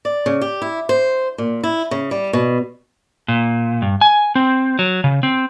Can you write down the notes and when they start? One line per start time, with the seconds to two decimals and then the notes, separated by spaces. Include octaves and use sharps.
0.05 D5
0.26 C#3
0.41 G4
0.62 E4
0.89 C5
1.38 A#2
1.63 E4
1.91 C#3
2.11 G3
2.33 B2
3.28 A#2
3.82 G2
4.01 G#5
4.35 C4
4.79 F#3
5.04 C#3
5.23 C4